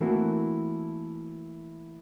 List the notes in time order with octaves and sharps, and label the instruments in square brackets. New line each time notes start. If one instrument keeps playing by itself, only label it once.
[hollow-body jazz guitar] E3 A3 A#3 C4 E4 F#4